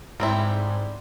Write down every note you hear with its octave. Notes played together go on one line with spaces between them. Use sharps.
G#2 G3 C4 E4